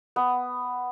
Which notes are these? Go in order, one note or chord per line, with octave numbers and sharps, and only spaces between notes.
B3